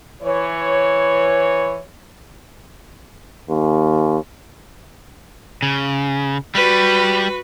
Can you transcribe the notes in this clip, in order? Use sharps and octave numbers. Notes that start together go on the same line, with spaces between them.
E3 C#5
D#2
C#3
G3 F#4 B4